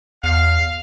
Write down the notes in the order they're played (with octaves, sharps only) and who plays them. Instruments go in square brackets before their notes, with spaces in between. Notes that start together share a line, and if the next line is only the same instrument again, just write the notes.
[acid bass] E2 [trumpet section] F5